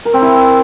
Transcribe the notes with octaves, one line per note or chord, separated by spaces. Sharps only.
A#4
C4
E4